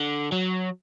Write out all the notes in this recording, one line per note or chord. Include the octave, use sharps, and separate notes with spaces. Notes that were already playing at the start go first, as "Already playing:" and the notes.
Already playing: D3
F#3